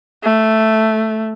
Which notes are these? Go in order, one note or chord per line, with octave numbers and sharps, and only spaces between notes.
A3